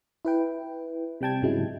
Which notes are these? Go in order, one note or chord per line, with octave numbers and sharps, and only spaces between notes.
E4 B4 G5
C3 G3 G5 A5 G#6
G#2 C#3 F#3 G#3 E4